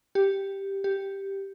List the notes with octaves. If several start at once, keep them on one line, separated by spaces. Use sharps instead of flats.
G4
G4